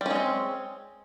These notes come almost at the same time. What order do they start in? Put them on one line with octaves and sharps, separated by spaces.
G3 C#4 G#3 C4